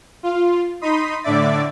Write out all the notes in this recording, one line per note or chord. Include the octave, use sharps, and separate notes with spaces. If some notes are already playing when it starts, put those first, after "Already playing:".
F4
D#4 B5 C6 D#6
A2 D3 D5 E5 D6 A6